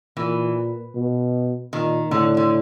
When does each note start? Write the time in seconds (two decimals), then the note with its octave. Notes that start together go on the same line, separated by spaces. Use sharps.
0.17 A#2 E3
0.95 B2
1.73 A#2 D#3
2.11 A2 D3
2.37 D3